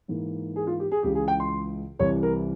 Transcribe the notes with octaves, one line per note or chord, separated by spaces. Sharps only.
G#2 E3 A#3
G#4
F4
G4
G#4
C#2 C#3 E3 G#3 G4
G#4
G5
C6
C2 C3 E3 C#5
A#4